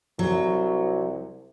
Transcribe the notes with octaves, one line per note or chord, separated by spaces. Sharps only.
C2 F#3